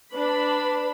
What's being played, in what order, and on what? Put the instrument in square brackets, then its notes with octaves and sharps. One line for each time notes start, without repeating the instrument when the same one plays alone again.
[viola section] D4 B5 [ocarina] B4